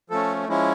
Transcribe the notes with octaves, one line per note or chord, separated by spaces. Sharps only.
F3 A3 C#4 A4
F3 G#3 C#4 E4